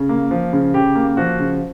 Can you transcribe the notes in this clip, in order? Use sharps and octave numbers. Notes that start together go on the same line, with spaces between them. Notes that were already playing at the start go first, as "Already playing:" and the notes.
Already playing: C#3
A#3
F3
C#3
C#3 G4
A#3
F3 F#4
C#3